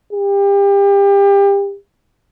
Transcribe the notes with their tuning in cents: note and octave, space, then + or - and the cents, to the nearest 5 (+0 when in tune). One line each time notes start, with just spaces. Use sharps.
G4 +30